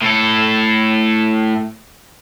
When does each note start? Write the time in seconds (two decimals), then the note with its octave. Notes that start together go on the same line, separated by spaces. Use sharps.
0.02 A2 A4